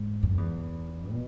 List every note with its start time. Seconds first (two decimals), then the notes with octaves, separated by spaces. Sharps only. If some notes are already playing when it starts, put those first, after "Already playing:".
Already playing: G#2
0.23 F#2
0.38 E2
1.12 B2